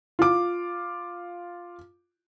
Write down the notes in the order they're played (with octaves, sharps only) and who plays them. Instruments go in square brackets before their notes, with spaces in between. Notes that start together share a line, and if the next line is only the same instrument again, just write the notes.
[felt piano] F4 D6